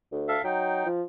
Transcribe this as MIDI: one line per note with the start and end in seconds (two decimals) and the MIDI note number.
0.12 0.37 38
0.28 0.42 69
0.28 0.42 76
0.28 0.42 77
0.44 0.84 54
0.44 0.88 63
0.44 0.88 79
0.86 1.03 53